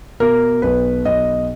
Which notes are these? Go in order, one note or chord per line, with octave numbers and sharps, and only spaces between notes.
B2 A#4
B1 B4
B1 D#5